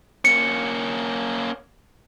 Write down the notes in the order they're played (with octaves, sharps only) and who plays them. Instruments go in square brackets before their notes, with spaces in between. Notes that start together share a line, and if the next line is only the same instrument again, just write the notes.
[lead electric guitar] A#3 C#4 [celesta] C#7